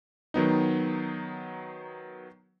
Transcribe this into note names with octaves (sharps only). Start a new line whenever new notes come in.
D#3 F#3 B3 D#4